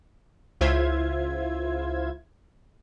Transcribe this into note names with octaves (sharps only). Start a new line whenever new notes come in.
C#2 E4 F4 C5 E5 G#6